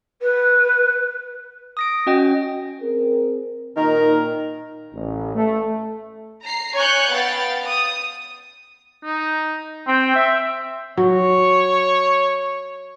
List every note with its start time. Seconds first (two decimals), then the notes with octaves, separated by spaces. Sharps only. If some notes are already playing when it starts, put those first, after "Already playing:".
0.22 B4
1.77 D#6 A#6 D7
2.07 C#4 F#4 D#5 G5
2.80 C4 G#4 A#4
3.76 A#2 D#3 D#4 A#4
4.93 A1
5.35 A3
6.42 A#5 C7
6.75 C#5 G#5 C#6 F#6 G6 C#7
7.11 B3 F5 G5 A6
7.64 D#6
9.04 D#4
9.88 C4 G5
10.16 E5
10.97 F#3 C#5